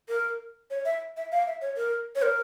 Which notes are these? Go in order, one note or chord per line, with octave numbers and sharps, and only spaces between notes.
A#4
C#5
E5
E5
F5
E5
C#5
A#4
C#5
A#4